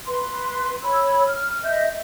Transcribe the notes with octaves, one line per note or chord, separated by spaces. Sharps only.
B4 C6
C#5 B5 E6
F6
D#5 E5 G6